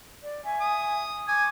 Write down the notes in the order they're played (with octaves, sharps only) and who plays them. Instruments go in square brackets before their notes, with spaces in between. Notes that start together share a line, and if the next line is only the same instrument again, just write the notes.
[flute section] D5
E5 G#5 C#6
[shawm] D#6
[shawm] G#5 [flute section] C#6 D6